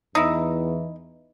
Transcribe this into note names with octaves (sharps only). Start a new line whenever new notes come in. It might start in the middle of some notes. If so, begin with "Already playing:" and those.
E2 E3 D#4 E4